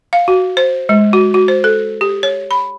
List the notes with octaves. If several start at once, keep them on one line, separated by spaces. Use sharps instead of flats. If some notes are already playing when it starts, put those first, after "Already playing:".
F5
F#4
C5
G#3
F#4
F#4
C5
A4
G4
C#5
B5